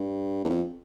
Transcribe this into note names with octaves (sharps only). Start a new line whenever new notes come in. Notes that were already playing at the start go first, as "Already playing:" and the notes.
Already playing: G2
E2
F2